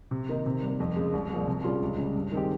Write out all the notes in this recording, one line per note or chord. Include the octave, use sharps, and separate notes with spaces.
C3
D#3 A#3 D#4
C3
G3 A#3
F2
C#3 G#3
C2
A#2 F3 G#3
C3
G3 C#4 F4 G#4
C#2
C#3 G3
G2
D#3 G#3 C4 G4